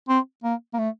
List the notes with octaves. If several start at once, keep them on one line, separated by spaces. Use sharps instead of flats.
C4
A#3
A#3
A3